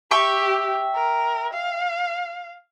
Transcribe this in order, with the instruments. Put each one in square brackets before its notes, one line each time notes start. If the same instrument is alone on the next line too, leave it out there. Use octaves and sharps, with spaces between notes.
[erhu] G4 [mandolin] E5 G5 C#6
[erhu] A#4
F5